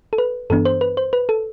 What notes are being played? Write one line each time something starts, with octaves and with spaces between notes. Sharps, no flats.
A4
B4
G2 E3 B3 D4 A4
C5
B4
C5
B4
A4